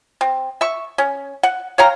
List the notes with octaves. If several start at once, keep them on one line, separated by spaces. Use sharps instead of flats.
C4
E5 C#6
C#4
F#5
C#5 F5 G5 A#5